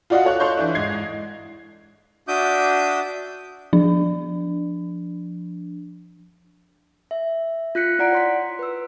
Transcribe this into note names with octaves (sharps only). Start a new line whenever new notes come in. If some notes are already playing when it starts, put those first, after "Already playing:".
F4 F#4 D5 D#5 F5 F#5
A4 C#5 F#6
A4 C#5 F5 C6 C#6 G6
E3 D4 E4
G#2 D#5 G#6 C7
D4 F#4 E5 D6 D#6 G6
F3 D4
E5
F4 F#6 B6 C#7
E4 D5 F#5 A#5 D7
C#5 C6 B6
B4 E6